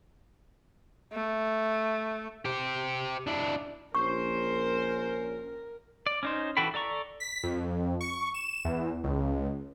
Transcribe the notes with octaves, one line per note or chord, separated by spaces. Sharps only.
A3
G4 C5
D4 E4
A#1 C#4 A#4 C5 C#6
D5
C#4 D#4 C5
E3 F#4 A4 G5 B5
A4 D5 A#5 C#6
B6
F2
C#6
E7
E2
C#2